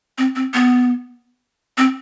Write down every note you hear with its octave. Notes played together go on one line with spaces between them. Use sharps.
C4
C4
B3
C4